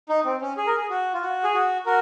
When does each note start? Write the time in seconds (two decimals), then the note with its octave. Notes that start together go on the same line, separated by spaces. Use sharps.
0.09 D#4
0.25 C4
0.41 C#4
0.57 G#4
0.67 A#4
0.77 G#4
0.90 F#4
1.14 F4
1.22 F#4
1.44 G#4
1.55 F#4
1.86 F#4 A#4